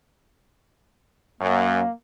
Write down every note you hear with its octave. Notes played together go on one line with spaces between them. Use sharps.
F#2 A#3